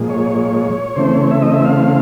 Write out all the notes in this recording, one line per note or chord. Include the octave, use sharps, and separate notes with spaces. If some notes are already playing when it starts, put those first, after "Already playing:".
Already playing: A#2 F3 G#3
C#5
C#3 E3 A3 C4 C5
C#5
E5
D#5
E5
F5